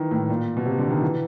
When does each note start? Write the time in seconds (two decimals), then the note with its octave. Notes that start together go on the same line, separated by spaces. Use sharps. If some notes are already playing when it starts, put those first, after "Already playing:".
Already playing: D#3 E3
0.11 A2
0.29 A#2
0.57 B2
0.66 C3
0.78 D3
0.90 D#3
1.02 E3